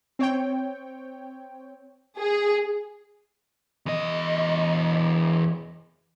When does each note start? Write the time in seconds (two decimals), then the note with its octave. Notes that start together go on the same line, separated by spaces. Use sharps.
0.19 C4 C#5 G5
2.19 G#4
3.86 E2 D#5